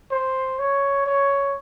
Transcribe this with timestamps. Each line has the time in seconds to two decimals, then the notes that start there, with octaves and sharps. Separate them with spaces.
0.11 C5
0.59 C#5
1.06 C#5